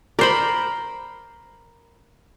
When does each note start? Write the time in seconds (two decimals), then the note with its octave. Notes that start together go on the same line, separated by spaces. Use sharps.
0.19 A#4 C5 D5 B5